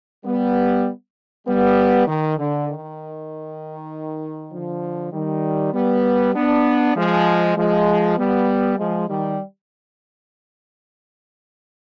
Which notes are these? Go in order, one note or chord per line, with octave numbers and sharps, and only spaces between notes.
G3 B3
G3 B3
D#3
D3
D#3
D3 F3
D#3 G3
G3 B3
B3 D4
F3 G#3
F3 G#3
G3 B3
F3 G#3
D#3 G3